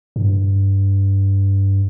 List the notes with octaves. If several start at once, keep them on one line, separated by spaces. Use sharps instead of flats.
G2